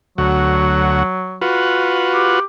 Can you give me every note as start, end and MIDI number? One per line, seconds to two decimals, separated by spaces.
0.18 1.03 38
0.18 1.43 54
0.18 1.03 66
1.41 2.40 65
1.41 2.40 66
1.41 2.40 71
2.14 2.44 67